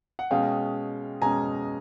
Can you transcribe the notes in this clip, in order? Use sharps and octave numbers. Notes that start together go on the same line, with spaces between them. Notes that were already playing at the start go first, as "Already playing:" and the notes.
F#5
B2 G#3 C#4 F5 G5
B2 G#3 C#4 G#5 A#5